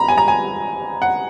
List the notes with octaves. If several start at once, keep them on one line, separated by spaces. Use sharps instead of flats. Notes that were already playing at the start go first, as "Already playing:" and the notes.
Already playing: A#5 B5
G#5
A#5
G#5
F#5